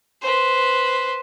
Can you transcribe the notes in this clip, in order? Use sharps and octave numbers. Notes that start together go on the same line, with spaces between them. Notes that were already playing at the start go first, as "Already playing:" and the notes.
B4 C5